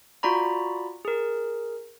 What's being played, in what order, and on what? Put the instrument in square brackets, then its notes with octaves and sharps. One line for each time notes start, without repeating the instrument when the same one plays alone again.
[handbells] F4 F#4 D5 A#5 B5
G#4 A#4